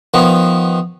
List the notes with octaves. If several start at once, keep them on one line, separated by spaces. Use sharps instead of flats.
D#3 F3 B3